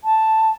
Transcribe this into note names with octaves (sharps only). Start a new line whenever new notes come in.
A5